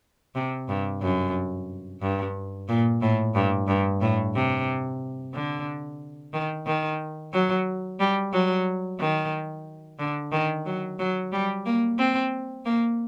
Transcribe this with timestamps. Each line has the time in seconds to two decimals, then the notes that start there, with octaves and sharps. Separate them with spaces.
0.35 C3
0.69 G2
1.02 F#2
2.01 G2
2.69 A#2
3.02 A2
3.35 G2
3.68 G2
4.01 A2
4.35 C3
5.33 D3
6.33 D#3
6.67 D#3
7.33 F#3
8.00 G3
8.33 F#3
8.99 D#3
9.99 D3
10.32 D#3
10.66 F#3
10.99 F#3
11.32 G3
11.66 A#3
11.98 C4
12.65 A#3